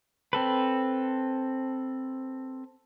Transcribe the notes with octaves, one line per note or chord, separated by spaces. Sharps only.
C4 A4 B4